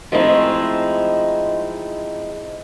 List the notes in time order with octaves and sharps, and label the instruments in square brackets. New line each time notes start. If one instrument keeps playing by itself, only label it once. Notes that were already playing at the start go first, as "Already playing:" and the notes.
[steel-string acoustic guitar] F3 G#3 A3 C4 D#4 E4